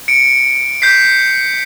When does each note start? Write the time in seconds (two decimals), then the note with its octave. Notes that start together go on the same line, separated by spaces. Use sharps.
0.08 C#7 D7
0.82 G6 B6 C7